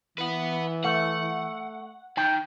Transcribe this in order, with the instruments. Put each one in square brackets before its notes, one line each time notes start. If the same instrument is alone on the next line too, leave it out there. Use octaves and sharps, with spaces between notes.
[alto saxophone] E3 [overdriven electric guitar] B4 F#5
[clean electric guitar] A3 [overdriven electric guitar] F#5
[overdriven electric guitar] D#3 [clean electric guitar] G5